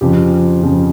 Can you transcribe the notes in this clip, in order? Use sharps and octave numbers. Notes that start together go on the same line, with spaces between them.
F2 C#3 F3 G4
F2 C#3 F3